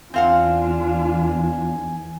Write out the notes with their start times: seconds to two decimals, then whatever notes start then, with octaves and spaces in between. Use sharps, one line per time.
0.14 E2 C4 D4 F4 F5 F#5 G#5